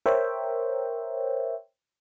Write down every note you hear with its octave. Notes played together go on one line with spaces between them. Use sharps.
A#4 C5 C#5 E5 G5